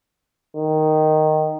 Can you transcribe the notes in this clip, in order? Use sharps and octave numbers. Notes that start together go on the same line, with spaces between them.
D#3